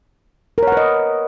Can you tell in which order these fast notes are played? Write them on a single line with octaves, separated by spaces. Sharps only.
A#4 C#5 F#5 B4 D#5